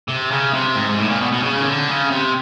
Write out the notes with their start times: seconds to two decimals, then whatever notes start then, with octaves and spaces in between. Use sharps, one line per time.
0.09 C3
0.31 C#3
0.53 C3
0.76 G#2
0.98 A2
1.10 A#2
1.21 B2
1.32 B2
1.43 C#3
1.60 D#3
1.65 D3
1.87 C#3
2.10 C3